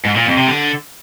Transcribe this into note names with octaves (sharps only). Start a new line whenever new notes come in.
G#2
A#2
F2
C3
D3